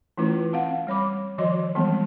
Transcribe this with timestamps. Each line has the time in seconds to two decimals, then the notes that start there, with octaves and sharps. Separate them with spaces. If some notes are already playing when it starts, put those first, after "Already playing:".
0.18 E3 A3 C#4 E4 F4 B4
0.53 C4 F5 F#5
0.87 G3 C#5 B5 D6
1.38 D#3 F3 F#4 C#5 D#5 C6
1.75 E3 G3 G#3 B3 C4